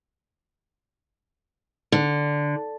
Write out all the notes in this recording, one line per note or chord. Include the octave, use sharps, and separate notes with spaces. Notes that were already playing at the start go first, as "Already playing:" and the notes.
D3